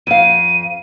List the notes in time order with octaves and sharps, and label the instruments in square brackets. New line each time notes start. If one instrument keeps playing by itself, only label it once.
[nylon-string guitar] F2 F5 [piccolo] D#7